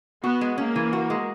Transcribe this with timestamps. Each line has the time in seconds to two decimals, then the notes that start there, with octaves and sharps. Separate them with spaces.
0.24 B3 F#4
0.41 G#3
0.58 A#3 C#4
0.76 E3
0.93 F#4
1.10 G#3